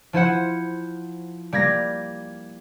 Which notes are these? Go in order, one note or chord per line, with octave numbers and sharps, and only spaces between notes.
F3 E4 C5 F#5
G3 A#3 G#6 A#6